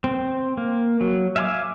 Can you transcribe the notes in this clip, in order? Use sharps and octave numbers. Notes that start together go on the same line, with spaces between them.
C4
A#3
F#3
E5 F5 G#5 B5 D6